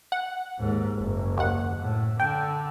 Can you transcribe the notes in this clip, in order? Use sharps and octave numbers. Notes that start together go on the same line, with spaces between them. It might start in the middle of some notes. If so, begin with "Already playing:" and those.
F#5
D#2 G#2
F#1
D#2 F#5
A2
D3 G5